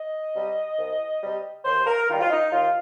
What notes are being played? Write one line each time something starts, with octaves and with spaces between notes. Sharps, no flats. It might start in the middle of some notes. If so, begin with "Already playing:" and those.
Already playing: D#5
C3 G3
C2
C3 G3
D#2 C5
A#4
D#3 G3 F4
F4
D#4
D#2 F4